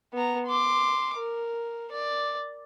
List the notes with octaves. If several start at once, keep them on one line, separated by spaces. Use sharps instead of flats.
B3 A#5
C6 D6
A#4
D5